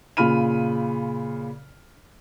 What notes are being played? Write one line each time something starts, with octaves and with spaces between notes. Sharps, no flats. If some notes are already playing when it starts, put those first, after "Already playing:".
A#2 C#3 F4 B5 F6 D#7